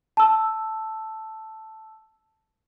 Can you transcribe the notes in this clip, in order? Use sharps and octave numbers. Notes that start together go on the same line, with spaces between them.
A5 E6